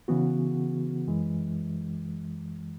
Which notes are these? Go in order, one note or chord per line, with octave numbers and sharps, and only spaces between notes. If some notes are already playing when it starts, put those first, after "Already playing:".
C#3 E3 B3 F#4
F#2 E3 G#3